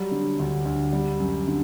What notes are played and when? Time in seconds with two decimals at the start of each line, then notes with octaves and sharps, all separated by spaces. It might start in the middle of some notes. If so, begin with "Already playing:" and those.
Already playing: F#3 G3
0.11 D3
0.39 D2
0.65 D2
0.93 G3
1.20 F#2
1.47 D3